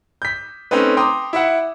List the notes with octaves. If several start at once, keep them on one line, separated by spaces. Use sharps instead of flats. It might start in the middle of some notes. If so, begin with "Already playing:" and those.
G6 B6
A3 C4 C#4 D#4 B4
G5 A#5 C6 D6 D#6
E4 E5 F#5